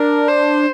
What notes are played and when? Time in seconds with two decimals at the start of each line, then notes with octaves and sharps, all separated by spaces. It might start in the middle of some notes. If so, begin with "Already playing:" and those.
Already playing: D4 A#4
0.28 C5